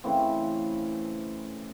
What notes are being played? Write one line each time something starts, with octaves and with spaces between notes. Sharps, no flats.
C#3 E3 A3 C4